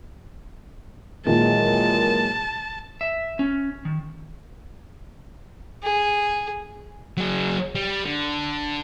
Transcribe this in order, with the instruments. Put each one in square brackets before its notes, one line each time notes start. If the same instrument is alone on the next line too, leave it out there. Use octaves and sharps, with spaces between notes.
[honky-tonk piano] A#2 D#3 A#3 [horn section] E3 F#3 G#3 [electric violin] A5
[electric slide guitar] E5
C#4
D#3
[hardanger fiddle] G#4
[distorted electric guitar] F#3 G#4
G3
D3